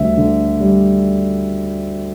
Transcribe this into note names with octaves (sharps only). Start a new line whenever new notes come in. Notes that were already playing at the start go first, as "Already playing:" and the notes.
Already playing: D2 G3 E5
D3
G3